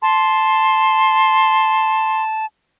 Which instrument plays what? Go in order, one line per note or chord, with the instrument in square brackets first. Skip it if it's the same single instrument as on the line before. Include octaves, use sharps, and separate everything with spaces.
[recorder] A5 [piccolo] C6